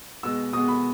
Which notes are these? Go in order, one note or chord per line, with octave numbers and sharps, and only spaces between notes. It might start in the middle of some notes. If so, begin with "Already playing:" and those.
B2 G#3 B3 E6
B2 G#3 B3 D#6
B5